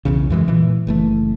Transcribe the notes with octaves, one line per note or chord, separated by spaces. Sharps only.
B1 E2 C#3
F#2 E3 G3 G#3
A#2 E3
F#1 E3 A3